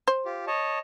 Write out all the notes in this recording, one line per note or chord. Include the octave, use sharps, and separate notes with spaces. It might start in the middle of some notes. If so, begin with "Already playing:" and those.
C5
F4 G4
C#5 D#5 A5